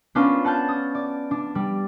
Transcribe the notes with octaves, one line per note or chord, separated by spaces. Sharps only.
B3 C#4 D4 F4 A#4
F#5 A5 F6 G6
D#6
D5
D4
G3